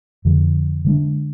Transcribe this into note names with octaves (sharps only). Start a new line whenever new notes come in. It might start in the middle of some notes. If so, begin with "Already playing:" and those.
F2 D3 F3
D3 G#3 D4